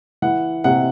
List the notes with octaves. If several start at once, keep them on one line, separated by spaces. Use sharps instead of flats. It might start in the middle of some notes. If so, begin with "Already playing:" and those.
E3 F#5
C3 F#5